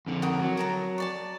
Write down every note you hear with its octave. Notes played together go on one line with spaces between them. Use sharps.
F2 D3
F#4 A#4 D#6
F#3
A#4 A5 A#5
C#5 D5 A5